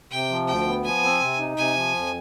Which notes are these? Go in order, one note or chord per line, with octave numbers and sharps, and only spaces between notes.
C3 G5
F3
D2 G5
B3
F3 G#5
C4
C3
D#4
C3 G#5
F3
F2